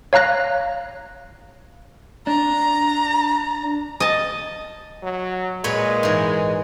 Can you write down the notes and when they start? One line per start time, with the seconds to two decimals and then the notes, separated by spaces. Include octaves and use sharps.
0.13 C#5 F5 A#5 F#6 A#6
2.27 D4 A#5
4.00 D#5 A5
5.03 F#3
5.64 A#2 G#3 B4 C#5
6.03 G#2 E3